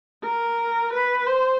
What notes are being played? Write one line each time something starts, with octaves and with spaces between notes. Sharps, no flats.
A#4
B4
C5